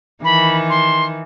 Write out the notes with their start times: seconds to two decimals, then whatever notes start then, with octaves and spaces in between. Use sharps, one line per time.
0.24 D#3 E3 B5
0.70 C6